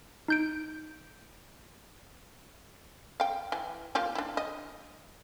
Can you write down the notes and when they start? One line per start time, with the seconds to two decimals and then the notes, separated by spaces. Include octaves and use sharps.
0.28 D#4 G6 D7
3.20 F5 G5
3.52 E3
3.95 A#3 F4 G4
4.15 D4 E4
4.37 D#5